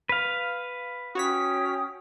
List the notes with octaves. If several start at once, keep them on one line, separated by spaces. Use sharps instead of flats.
B4 F5
C#4 F#4 C#5 G5 D#6 B6